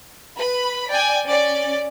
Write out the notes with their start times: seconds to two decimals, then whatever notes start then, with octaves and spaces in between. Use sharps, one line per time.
0.38 B4 B5
0.89 D5 G5 G#5
1.26 C#4 D5